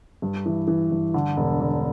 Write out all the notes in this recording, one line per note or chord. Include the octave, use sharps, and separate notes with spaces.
G2
E3
E3
G2
D3
E1
D3